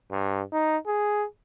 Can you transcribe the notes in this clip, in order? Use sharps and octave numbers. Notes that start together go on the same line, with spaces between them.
G2
D#4
G#4